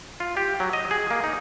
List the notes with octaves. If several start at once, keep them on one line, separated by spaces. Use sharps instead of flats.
F4
G4
F#3
D#5
G#4
A#3
D#4